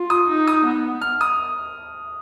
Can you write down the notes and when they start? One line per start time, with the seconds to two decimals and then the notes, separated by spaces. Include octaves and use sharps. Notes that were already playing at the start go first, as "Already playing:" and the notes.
Already playing: F4
0.10 D#6
0.28 D#4
0.47 D#6
0.65 B3
1.01 F6
1.21 D#6